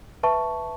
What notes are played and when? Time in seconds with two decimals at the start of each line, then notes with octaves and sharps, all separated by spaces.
0.23 B4 E5 A5 C#6